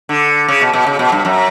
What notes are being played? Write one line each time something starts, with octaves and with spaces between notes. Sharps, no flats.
D3
C#3
B2
B2
C#3
B2
G2
F#2